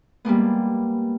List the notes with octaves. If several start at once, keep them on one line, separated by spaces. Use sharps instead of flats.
G3 G#3 A#3 B3